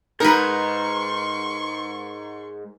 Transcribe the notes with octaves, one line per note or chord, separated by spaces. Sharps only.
D#2 G#2 D#4 A#4 B4 C6 C#6